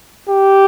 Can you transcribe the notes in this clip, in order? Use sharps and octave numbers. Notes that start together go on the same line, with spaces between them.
G4